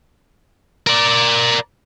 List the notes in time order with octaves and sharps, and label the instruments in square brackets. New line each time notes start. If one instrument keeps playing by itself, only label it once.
[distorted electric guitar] A#4 D5